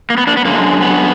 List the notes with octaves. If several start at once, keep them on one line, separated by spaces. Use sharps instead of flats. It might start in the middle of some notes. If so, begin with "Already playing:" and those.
A#3
B3
A#3 D4
B3
F#2 D3 G#3 A#3
B3